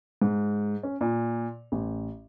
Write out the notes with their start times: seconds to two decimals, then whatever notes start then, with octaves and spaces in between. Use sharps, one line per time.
0.22 G#2
0.83 C#4
1.01 A#2
1.72 A1